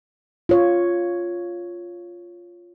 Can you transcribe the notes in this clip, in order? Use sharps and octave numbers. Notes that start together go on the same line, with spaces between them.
F4 C#5